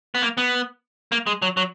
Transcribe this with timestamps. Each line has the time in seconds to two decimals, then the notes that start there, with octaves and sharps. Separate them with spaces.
0.15 B3
0.22 A#3
0.37 B3
1.12 A#3
1.27 G#3
1.42 F#3
1.57 F#3